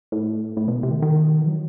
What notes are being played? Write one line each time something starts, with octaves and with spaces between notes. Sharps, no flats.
A2
A2
B2
C3
D#3
D#3
E3
F#3